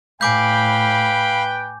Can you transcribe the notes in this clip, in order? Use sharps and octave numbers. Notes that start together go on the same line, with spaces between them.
A2 B4 F5 G5 G#5 B5 D6 G6